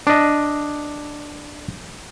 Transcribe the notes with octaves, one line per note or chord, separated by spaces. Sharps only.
D4 D#5